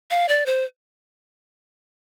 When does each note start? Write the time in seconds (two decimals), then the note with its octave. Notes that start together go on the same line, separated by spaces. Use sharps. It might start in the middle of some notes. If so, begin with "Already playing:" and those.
0.11 F5
0.29 D5
0.46 C5